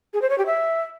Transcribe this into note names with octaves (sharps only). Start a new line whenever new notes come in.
G#4
C5
C#5
G4
E5